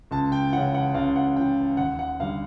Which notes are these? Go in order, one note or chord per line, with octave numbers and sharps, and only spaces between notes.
C#2 A5
G5
C#3 E3 F#5
F#5
C#2 F5
F#5
C#3 E3 G5
D#2 F#5
F#5
D3 G3 F5